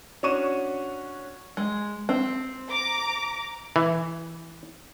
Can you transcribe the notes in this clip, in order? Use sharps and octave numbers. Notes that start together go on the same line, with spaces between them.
C#4 D4 F#4 C#6 D#7 E7
G#3
C4
A#5 D6
E3